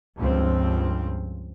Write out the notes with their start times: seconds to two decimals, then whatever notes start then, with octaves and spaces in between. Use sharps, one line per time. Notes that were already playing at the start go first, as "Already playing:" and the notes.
0.18 C#2 G2 F3 C4